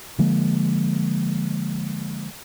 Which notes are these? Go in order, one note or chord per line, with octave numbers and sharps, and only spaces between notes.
D3 F3 G#3 A#3